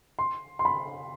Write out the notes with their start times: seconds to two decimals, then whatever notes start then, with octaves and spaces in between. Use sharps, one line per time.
0.19 C6
0.59 C6
0.65 B5